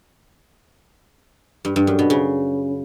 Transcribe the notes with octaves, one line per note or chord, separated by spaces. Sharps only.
G2
G2
F#2
B2
C#3